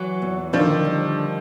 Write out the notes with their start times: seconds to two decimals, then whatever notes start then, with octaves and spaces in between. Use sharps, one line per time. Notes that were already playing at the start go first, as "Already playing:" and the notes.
Already playing: E3 F#3
0.22 E2
0.53 D3 D#3 F3
0.85 G3